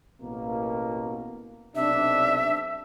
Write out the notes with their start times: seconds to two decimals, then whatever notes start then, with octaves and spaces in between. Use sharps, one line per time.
0.20 A1 B2 A#3
1.75 B1 C3 D4 E5